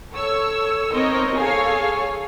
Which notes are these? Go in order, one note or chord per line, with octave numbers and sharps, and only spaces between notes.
A4 C#5 E6
B3 C4 D#4 A#4 C#5 D#5
G#4 A4 C#5 F5 G#5